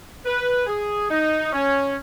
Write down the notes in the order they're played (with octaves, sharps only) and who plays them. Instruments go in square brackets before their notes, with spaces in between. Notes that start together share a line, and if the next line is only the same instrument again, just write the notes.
[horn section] B4
G#4
D#4
C#4